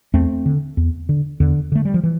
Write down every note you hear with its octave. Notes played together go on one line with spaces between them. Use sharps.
E2 A3 C4
D3
E2
D3
E2 D3
D3 A3
G3
F3
E3